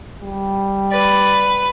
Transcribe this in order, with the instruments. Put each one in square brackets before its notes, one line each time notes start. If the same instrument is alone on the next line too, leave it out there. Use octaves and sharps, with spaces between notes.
[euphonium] G3
[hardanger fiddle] B4 [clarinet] D5